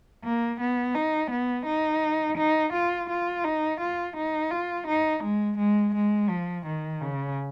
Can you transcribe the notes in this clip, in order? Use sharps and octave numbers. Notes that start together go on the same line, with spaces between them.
A#3
B3
D#4
B3
D#4
D#4
F4
F4
D#4
F4
D#4
F4
D#4
G#3
G#3
G#3
F3
D#3
C#3